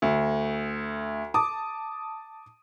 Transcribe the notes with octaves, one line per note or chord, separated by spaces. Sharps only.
D2
A5 D6 D#6